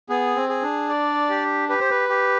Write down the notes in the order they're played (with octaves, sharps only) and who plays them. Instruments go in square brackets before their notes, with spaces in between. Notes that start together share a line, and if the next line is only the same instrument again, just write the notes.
[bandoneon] B3 [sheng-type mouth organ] G#4
[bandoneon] C4
[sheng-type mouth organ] G#4
[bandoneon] D4
[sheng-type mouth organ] D5
G4
[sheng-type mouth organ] G4 [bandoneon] B4
[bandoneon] C5
B4
[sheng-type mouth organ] G4